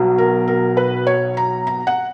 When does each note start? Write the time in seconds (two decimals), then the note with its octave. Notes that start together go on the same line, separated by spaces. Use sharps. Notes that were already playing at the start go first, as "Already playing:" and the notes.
Already playing: B1 B2 F#3
0.18 A#4
0.48 A#4
0.77 B4
1.07 C#5
1.37 A#5
1.67 A#5
1.87 F#5